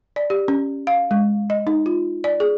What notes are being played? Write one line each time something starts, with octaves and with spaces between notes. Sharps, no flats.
D5
G4
C#4
F5
G#3
D#5
D#4
F4
D5
G#4